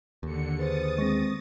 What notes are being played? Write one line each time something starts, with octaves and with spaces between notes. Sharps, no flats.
D#2 D3 C#7
G#4 B4 C5 D#6 A6
G#3 C4 C#6 A#6